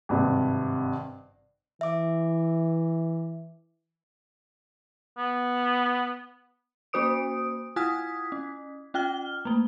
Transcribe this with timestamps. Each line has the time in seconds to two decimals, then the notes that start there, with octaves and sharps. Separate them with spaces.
0.09 G#1 G2 C3
1.81 E3 E5 D6
5.18 B3
6.93 A#3 C#4 F#4 C5 D#6 D7
7.76 E4 F4 G#5 D#6 G#6 B6
8.32 C#4
8.94 C#4 F4 G5 F6 G7
9.45 A3 A#3